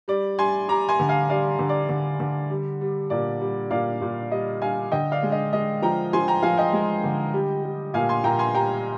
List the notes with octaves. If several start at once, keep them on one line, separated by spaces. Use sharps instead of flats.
G3 D5
G3 G#5 C6
G3 A#5 D6
G#5 C6
D3
F5 G#5
G3 D5 F5
D3
D5
D3
D3
G3
G3
A#2 D5
G3
A#2 D5 F5
A#2
G3 D#5
G3 F5 G#5
D3 D#5 G5
D5 F5
G#3
D#5
G#3 D#5
F3 G5 A#5
F3 G#5 C6
G5 A#5
F3 F5 G#5
D#5 G5
G#3
D3
G3
G3
A#2 F5 G#5
G#5 C6
A#2 G5 A#5
G#5 C6
G3 G5 A#5